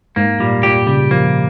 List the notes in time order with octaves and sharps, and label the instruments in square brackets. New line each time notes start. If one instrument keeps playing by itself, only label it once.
[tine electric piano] G#2 [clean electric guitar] A#3
[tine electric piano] A#2 [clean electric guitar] G3
[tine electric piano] A#2 [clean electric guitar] G4
[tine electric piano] C#3 [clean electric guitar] G3
[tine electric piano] F3 [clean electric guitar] A#3